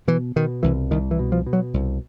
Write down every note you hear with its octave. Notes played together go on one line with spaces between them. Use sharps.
B2 E3
B2 D#3
C2 E3
C2 D#3
E3
B2
F3
B2
F#3
C2